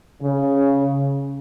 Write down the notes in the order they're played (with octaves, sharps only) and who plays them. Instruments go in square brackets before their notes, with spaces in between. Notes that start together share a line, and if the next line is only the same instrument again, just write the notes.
[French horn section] C#3